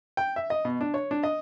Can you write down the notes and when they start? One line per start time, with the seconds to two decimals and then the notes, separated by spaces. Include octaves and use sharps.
0.17 G5
0.36 E5
0.50 D#5
0.65 B2
0.81 D4
0.94 C#5
1.11 D4
1.24 D#5